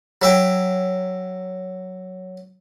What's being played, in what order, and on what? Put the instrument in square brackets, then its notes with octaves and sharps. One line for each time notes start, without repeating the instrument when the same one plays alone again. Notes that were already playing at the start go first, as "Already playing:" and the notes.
[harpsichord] F#3 E5 G5